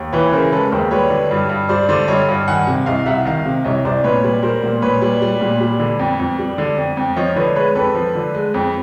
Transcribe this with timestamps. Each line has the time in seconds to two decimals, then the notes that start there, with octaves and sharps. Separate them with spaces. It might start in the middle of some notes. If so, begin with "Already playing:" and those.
Already playing: D#2
0.12 E3 B4 C#5
0.32 C#3 A#4 C5
0.52 G#3 A4 B4
0.71 D#2 A#4 C5
0.91 G3 B4 C#5
1.10 D3
1.31 G2
1.49 G2
1.69 G3 C5 D5
1.89 D3 C5 D5
2.08 G2 C#5 D#5
2.29 G2
2.48 D#3 F#5 G#5
2.67 C3
2.86 C2 D#5 F5
3.06 C2 E5 F#5
3.25 D#3 D#5 F5
3.45 C3
3.64 C2 C#5 D#5
3.85 C2 C5 D5
4.04 A#2 B4 C#5
4.24 G3
4.43 G3 A#4 C5
4.63 A#2
4.82 A#2 B4 C#5
5.02 G3
5.22 G3
5.41 A#2
5.61 G3
5.80 D3
5.99 F2
6.20 F2
6.39 G3
6.58 D3
6.77 F2
6.97 F2
7.16 F3 C#5 D#5
7.36 D3 B4 C#5
7.56 G#3 B4 C#5
7.75 F2 A4 B4
7.95 F3
8.15 D3
8.35 G#3
8.54 F2